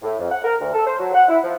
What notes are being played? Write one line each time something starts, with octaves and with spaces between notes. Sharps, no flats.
A2
F2
F#5
A#4
D2
A4
C5
F#3
F#5
E4
F3